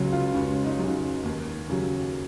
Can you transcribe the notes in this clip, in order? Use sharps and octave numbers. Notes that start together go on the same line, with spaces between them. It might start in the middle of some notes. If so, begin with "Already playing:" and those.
Already playing: C#2 C#3 F#3
F4
C#2 C#4
D#4
C#3 F#3
D#2
C#3 F#3